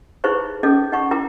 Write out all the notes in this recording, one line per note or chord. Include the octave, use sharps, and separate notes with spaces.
D#4 E4 G#4 B4 C5 C#6
C#4 D#4 G#4 A4 D6
D#4 F#5 C#6
E4 A#4 G5 A#5 D6